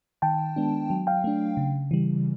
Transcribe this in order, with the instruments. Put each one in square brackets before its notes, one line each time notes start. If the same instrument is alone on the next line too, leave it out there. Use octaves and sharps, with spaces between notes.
[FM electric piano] D#3 G5 A5
G#3 B3 D4
F#3
F5 G5
A3 D4
C#3
E3 G3